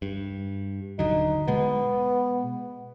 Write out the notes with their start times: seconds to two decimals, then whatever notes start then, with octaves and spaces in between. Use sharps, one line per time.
0.02 G2
0.99 D#1 D3 F#3 D#4
1.48 B2 G#3 B3